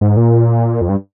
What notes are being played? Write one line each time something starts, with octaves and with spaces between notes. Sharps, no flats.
G#2
A#2
F2
G2